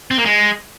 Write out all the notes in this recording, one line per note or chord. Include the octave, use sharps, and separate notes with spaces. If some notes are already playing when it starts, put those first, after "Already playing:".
C4
A#3
G#3